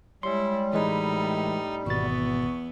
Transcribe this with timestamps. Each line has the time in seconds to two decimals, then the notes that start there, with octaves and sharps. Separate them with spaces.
0.23 G3 G#3 E4 C#5 C6
0.73 A2 E3 G#3 D#4 B4 B5
1.86 G#1 E2 B2 B3 C#6 A6